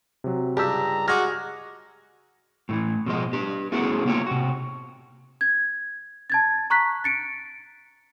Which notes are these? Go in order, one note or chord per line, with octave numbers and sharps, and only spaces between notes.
C3 F#3
C#2 G2 G4 A5 A#5 E6
G#3 F#4 G#5 D6 F6 G#6 A#6
A2 D3 E3
B2 F3 G#3 D#5
D4 G4
A3 B3 C#4 E4 F#4 G#4
C#3 A#3 D#4 F4 G4 C#5
C3 F#4
G#6
A5 G#6 A6
A#5 C#6 F#6 B6
A6 C#7 D7